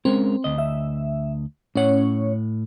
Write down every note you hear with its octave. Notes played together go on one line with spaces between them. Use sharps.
G#3 C4 C#4 A#4
D2 D#5
E5
A2 C#4 C#5 F#5